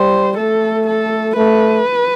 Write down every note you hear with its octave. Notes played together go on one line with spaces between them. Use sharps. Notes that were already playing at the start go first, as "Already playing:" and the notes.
Already playing: G3 C5
A3 A4
A4
A3 B4